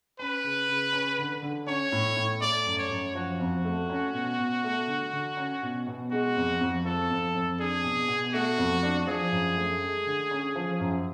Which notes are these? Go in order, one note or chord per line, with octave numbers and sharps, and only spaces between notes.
C#4 B4
C#3
C#3
C#4
D3
D3
C#4 C#5
A2
A2
A3 D5
F#2
C#5
F#2
F3 F#4
F2
A3
C#4
B2
B2
A3
D3
D3
C#4
B2
B2
G#3 F#4
F2
F2
F3 A4
F2
F2
D4 G#4
B2
B2
A3 F#4
F2
D4
F3 G#4
F#2
A3
G#3
D3
C#4
F3
F#2